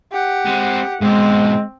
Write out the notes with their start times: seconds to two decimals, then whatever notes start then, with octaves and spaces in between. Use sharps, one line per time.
0.12 G4 F#5
0.45 G#3 C4
1.01 G#2 B2 G#3 C4